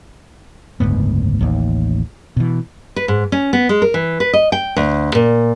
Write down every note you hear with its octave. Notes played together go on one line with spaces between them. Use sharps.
F#1 D2 G#2 B3
A1 D#2
B2 E3
B4
G#2
C#4
B3
G#3
A#4
E3
B4
D#5
G5
D2
A#2